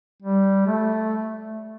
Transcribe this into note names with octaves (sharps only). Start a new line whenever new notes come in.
G3
A3